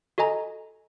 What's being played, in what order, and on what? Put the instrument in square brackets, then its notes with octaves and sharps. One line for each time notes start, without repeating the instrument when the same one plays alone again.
[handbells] F#4 A4 D#5 G#5 A#5